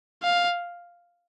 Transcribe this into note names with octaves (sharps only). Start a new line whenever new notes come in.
F5